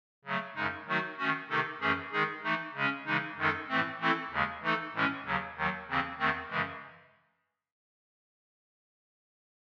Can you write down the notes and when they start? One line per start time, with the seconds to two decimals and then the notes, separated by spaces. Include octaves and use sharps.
0.25 C#3 F#3 A3
0.55 F#2 C#3 G#3 D#4
0.87 D#3 F#3 A3 D#4 F#4
1.18 D#3 A3 C#4 F#4
1.49 C3 D#3 A3 D#4 A4
1.80 F#2 E3 A3 C#4 G#4
2.12 D#3 G#3 D#4 G#4
2.43 E3 A3 D#4
2.75 C#3 G#3 C#4
3.06 C#3 E3 G#3 D#4
3.37 F#2 D#3 G#3 D#4 A4
3.69 A2 E3 A3 C4
3.99 E3 A3 C4 E4 A4
4.31 D#2 C#3 G#3
4.62 E3 A3 D#4 A4
4.94 A2 E3 G#3 C#4
5.25 D#2 C#3 F#3
5.56 D#2 D#3 F#3
5.88 D#2 C#3 E3 C4
6.19 E2 D#3 A3 C4
6.50 F#2 C#3 E3 G#3